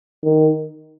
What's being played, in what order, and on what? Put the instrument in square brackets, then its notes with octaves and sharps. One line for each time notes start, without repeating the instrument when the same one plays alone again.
[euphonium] D#3